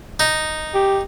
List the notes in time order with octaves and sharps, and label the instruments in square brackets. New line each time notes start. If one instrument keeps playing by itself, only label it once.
[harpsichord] D#4
[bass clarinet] G4